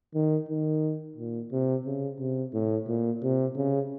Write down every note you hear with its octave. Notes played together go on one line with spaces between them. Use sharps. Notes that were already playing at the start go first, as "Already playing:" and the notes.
D#3
D#3
A#2
C3
C#3
C3
A2
A#2
C3
C#3